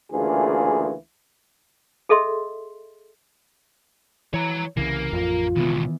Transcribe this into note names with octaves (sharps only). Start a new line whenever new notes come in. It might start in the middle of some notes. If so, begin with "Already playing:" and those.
D2 C#3 E3 A#3 F4 G#4
G#4 A4 D#5 E5 C6
E3 C#5 A#5
C2 C#3 E3 A#3
A1 F2 F4
C#2 B2 D#3 E3 B3